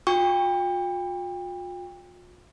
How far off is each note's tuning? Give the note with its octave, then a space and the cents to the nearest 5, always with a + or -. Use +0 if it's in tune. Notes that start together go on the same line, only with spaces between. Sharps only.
F4 +40 G5 +30 C#6 +0